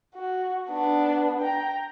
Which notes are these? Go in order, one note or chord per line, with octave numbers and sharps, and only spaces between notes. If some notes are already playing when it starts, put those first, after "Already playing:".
F#4
B3 D4
G5 A#5